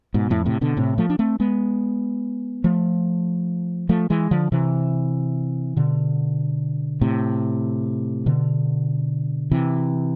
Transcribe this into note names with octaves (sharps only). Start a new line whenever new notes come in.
G#2 B2
F2 A2
A2 C3
B2 D3
A2 C3
F3 A3
D4
A3 C4
G#3 B3
F3 A3
F3 A3
E3 G#3
D3 F3
C3 E3
B2 D3
A2 C3
B2 D3
C3 E3